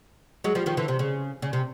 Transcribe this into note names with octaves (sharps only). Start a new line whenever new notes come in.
F#3 G#3
F3 G3
D#3 F3
D3 E3
C3
C#3
C#3
C3